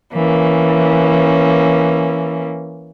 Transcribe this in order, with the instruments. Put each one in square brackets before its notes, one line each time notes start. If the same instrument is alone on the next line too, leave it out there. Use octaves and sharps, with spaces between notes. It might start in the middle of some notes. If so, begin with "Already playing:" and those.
[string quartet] E3 A#3 C#4